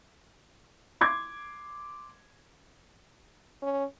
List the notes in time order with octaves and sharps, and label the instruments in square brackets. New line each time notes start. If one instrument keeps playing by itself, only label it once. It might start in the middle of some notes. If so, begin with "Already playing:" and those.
[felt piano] C6 D6 G#6
[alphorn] C#4